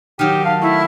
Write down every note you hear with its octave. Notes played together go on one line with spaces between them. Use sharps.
D#3 F#3 G4
F5 A5
A3 E4